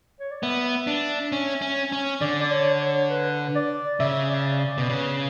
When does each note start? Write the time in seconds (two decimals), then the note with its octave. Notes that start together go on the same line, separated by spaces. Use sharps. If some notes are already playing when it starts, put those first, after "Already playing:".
0.20 C#5
0.31 D5
0.43 B3 E5
0.87 D4
1.32 C#4
1.62 C#4
1.92 C#4
2.21 D3 D5
2.42 D5
2.51 C#5
2.81 C#5
3.10 B4
3.55 D5
4.00 C#3 E5
4.30 D5
4.59 D5
4.78 B2
4.89 C#3 B4